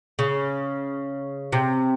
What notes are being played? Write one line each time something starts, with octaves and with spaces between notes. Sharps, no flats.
C#3
C3